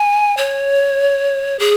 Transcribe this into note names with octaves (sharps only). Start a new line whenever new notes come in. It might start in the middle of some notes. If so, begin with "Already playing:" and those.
Already playing: G#5
C#5
G#4